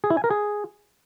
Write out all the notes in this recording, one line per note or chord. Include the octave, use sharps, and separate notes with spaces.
G#4
E4
G#5
A#4
G#4